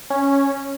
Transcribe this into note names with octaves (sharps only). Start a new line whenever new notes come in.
C#4